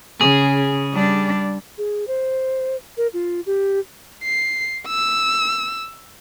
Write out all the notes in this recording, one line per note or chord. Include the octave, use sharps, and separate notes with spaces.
C#3 G#4
G3 D4
G#4
C5
A#4
F4
G4
C7
E6